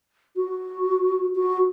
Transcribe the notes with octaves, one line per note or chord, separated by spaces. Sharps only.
F#4
F#4